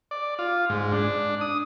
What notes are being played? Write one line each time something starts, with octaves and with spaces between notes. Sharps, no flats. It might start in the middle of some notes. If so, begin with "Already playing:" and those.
D5
F4
G#2
D4
D#6